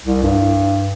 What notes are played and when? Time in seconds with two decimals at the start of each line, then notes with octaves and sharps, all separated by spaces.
0.04 C2
0.23 G2